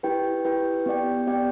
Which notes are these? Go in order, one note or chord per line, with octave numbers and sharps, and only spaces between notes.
E4 G4 B4 G5
E4 G4 B4 G5
B3 G4 D5 G5
B3 G4 D5 G5